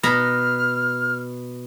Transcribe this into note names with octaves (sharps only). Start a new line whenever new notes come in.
B2 B4 A#5 F6